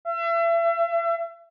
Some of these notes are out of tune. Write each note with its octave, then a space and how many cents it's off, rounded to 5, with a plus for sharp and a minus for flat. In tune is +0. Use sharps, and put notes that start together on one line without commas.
E5 +35